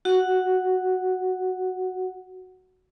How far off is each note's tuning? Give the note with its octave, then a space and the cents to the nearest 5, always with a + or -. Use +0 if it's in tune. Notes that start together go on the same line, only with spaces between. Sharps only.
F#4 +0 F#5 +0